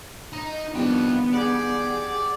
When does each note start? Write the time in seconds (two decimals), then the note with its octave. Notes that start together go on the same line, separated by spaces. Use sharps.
0.33 D#4 D#5
0.74 F2 D#3 G3 B3 D4 G5
1.33 G4 G#4 D5 F#5